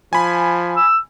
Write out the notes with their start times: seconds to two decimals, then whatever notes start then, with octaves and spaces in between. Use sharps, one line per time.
0.13 F3 G#5 B5
0.76 E6